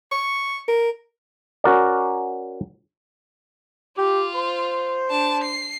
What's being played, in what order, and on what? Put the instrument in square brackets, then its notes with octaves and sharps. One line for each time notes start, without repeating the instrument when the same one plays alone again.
[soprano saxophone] C#6
A#4
[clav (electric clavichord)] C#4 F#4 A#4 D5
[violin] F4 [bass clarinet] G4
[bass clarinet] C5
[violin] D4 A5
C7